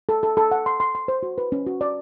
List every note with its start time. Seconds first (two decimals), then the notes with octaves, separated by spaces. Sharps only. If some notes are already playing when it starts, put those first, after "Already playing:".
0.09 A4
0.23 A4
0.37 A4
0.51 F#5
0.66 C6
0.80 C6
0.95 C6
1.08 C5
1.23 F#4
1.38 B4
1.52 C#4
1.66 F#4
1.81 D5